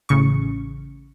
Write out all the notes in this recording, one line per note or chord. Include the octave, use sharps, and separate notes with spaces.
A1 C#3 C#6